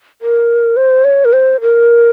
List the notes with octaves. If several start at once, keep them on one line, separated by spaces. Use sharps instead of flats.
A#4
C5
C#5
A#4
C5
A#4